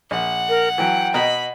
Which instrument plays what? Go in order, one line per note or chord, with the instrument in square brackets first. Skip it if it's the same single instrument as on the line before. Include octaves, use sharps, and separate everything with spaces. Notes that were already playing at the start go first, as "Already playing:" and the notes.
[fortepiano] A#1 [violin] F#5
[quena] A#4
[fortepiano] E3 F#3 [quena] G5
[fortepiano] B2 D#5 A#5 [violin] B5